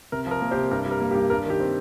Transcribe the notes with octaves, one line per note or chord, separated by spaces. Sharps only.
C3 A#4
F3 A#4
A#3
G4 C5
C3
G2 A#4
G3
A#4
A#3
G4
G2
G2 A#4
D#3 G4
C4